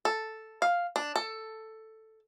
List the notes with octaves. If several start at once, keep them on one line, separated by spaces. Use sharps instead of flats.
A4
F5
D4
A4